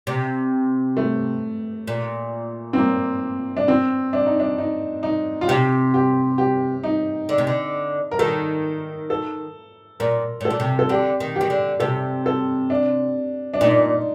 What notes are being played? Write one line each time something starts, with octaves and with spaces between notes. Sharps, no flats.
C3
A3
A#2
C4
A#3
D4
C4
D4
D#4
D4
D#4
D#4
F4
C3 G4
G4
G4
D#4
D3
C3
D3
A#4
D#3 A4
A4
A#2 A#4
A2
A4
A#2
C3
A4
D3 G4
D#3
D#3 G4
D3
C3 A4
A4
D4
D4
A#2 D#4